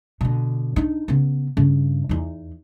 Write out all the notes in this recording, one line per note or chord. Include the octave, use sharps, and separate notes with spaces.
B2 D3
D4 D#4
C#3 B3
G2 C#3
E2 D#4